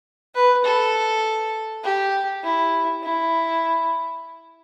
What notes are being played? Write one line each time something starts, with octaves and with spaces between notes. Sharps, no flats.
B4
A4
G4
E4
E4